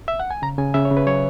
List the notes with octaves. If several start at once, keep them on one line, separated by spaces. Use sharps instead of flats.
E5
F#5
G#5
C#3 A#5
C#3 G#5
C#3 E5
C#5
C#3
B4
F#3 C#5